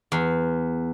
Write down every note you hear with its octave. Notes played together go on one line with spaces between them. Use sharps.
E2